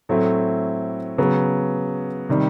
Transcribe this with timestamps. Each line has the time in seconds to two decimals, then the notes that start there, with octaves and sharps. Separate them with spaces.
0.09 A2 F#3 A3 C4 E4
1.18 C#3 F#3 B3
2.29 C3 D#3 G3